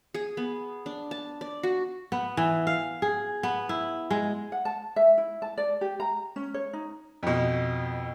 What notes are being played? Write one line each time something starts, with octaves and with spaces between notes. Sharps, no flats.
G#4
B3
D4
A5
D5
F#4
B3
E3
F5
G#4
B3
E4
G#3
F#5
A5
E5
E4
A5
D5
G4
A#5
C#4
C#5
D#4
F2 B2